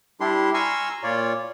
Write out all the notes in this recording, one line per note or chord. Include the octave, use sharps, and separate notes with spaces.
G3 D4 E4 G4 C6
G#5 A#5 C6 C#6 E6 F6
A#2 F4 C#5 D5